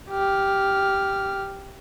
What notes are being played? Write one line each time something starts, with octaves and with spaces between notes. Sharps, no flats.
G4 F6